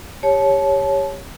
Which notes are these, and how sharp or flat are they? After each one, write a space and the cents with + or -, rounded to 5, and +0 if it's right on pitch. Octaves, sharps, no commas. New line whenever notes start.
G4 +20 C#5 +0 A5 -25